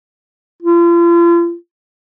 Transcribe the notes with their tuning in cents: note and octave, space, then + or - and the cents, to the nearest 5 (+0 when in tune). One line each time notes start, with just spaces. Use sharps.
F4 -40